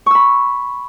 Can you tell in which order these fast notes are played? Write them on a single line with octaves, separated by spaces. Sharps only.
C#6 E6 B5